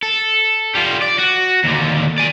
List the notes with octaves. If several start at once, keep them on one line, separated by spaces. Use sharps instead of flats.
A4
G3 F4
D5
F#4
D#2 D3
D5 G#5